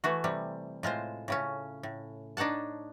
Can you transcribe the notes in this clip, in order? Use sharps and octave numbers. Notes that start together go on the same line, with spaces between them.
E3 A3 F#4
C3 G3
A2 G#3 F4 C5
A2 C#3 C#4
A2
D4 D#4 C#5 F#5 A5